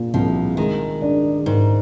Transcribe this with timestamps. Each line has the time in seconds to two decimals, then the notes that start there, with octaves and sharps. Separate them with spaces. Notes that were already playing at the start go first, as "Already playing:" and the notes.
Already playing: A#2
0.14 C2 F3
0.57 D#3 G#3
1.02 D4
1.46 G#2 D#3